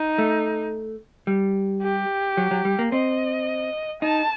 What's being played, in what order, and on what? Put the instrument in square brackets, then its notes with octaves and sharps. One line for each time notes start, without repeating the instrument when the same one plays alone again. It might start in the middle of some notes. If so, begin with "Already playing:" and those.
Already playing: [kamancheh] D#4
[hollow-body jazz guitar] A3
G3
[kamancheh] G4
[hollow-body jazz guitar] F#3
F#3
G3
A#3
[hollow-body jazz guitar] C4 [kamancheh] D#5
[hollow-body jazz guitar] D#4 [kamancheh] A5